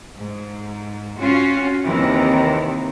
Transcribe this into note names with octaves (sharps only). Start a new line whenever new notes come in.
G#2
C#4 F4 F#4
D#2 C3 D#3 E3